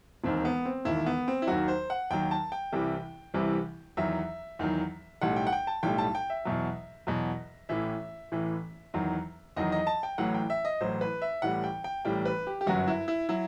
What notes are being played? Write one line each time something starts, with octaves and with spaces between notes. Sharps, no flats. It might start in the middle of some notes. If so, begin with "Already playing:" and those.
E1 D#2 D#3 C4
B3
C4
E1 D#2 D#3 E4
B3
C4
E4
D#2 D#3 F#3 F#4
C5
F#5
D#2 D#3 F#3 G5
A5
G5
C2 C3 E3 G3
C2 C3 E3 G3
E2 D#3 F#3 E5
E2 D#3 F#3
B1 A2 G3 F#5
G5
F#5
G5
A5
B1 A2 G3 G5
A5
G5
E5
E2 B2 F#3
E2 B2 F#3
A1 A2 E3 E5
A1 A2 E3
E2 D#3 F#3
E2 D#3 F#3 D#5
D#5
A5
G5
A1 A2 F#3 F#5
G5
E5
D#5
A1 A2 F#3 C5
B4
E5
A1 A2 G3 F#5
G5
G5
A1 A2 G3 G5
B4
G4
G4
G1 F#2 F#3 F#4
E4
E4
F#3 E4